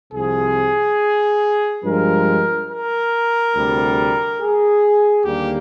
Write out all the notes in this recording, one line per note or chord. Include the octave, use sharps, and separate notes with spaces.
C2 C3 F3 G#4
G2 F3 G#3 A#4
A#4
D2 C3 G3
G#4
D#2 D3 G3 A#3 G4